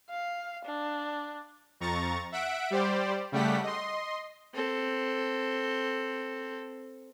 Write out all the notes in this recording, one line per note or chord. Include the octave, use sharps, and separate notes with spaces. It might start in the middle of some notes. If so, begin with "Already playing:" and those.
F5
D4
F2 A#5 C#6 A6
E5 F#5 B6 D7
G3 G4 C5 D5
C#3 G3 A3 G4 F#5 B6
D#5 C6
C4 A4